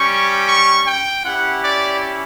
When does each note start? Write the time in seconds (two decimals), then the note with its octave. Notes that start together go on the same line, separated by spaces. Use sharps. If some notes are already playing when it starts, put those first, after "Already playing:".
Already playing: G3 C#4 G4 C#6
0.46 C#6
0.85 G5
1.24 C#4 E4 G4 F#5
1.63 D5